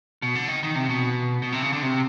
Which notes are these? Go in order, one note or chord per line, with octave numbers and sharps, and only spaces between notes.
B2
D3
D#3
D#3
C3
B2
B2
C3
C#3
D3
C3